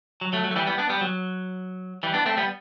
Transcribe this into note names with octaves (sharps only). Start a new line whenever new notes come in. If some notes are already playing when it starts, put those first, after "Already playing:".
F#3
F#3 A3
F#3
A3
E3 G3
G3 B3
B3 D4
G3 B3
F#3
E3 G3
B3 D4
A3 C4
G3 B3